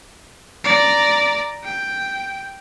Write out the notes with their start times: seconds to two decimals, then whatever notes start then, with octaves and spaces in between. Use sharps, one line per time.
0.64 D5 A#5
1.64 G5